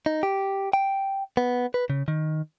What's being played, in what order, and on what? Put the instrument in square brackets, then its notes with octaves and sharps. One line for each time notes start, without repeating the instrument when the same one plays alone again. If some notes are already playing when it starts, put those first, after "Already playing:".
[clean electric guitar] D#4
G4
G5
B3
B4
C#3
D#3